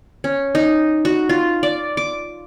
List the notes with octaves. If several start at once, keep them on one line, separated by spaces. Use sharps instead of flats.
C#4
D#4
F#4
F4
D5
D6